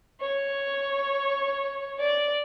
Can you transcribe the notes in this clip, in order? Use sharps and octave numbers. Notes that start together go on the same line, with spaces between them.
C#5
D5